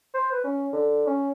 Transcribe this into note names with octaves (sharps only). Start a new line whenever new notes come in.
C5
B4
C#4
D3
C#4